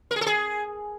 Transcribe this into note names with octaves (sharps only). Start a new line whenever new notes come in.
A#4
G#4
A4
G#4